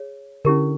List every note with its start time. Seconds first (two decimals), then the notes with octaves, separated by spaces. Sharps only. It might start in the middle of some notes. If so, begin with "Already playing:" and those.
Already playing: G#4 C#5
0.45 D3 C#4 E4 G4 A#4